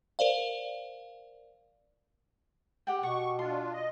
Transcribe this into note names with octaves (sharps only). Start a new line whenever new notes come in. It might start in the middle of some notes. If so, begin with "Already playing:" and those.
A#4 C5 D5 F5
G4 F#5 G5
B2 F#5 C#6
D4 F4 C6
D#5